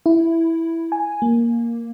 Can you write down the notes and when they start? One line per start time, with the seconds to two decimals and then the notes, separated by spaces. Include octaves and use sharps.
0.06 E4
0.92 G#5
1.22 A#3